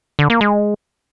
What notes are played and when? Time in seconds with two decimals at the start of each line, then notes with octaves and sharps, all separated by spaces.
0.19 D3
0.30 A#3
0.41 G#3